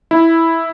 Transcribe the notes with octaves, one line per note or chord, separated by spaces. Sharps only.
E4